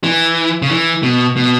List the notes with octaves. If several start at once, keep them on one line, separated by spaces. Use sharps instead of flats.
E3
C#3
E3
B2
B2